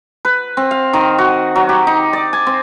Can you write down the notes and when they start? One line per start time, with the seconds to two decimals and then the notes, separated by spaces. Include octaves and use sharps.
0.25 B4
0.57 C4
0.71 F5
0.93 D#3
1.18 F#4
1.56 F#3
1.69 G4
1.87 D#4
2.13 D5
2.33 G#5
2.47 C4